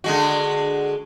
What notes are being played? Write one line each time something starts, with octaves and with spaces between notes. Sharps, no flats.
D3 G#3 F#4